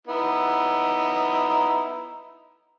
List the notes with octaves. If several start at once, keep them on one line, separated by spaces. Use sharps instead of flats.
B3 D#4 E4